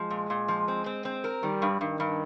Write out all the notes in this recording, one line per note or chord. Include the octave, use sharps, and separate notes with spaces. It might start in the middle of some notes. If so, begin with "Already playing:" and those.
Already playing: F3 G#3
A#2
A#2
F3
C4
C4
C4
A#4
D#3 G3
G2
G2 D#3
G2